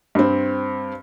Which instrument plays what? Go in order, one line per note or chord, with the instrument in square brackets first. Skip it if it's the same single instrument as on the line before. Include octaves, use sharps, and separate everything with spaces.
[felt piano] G2 C4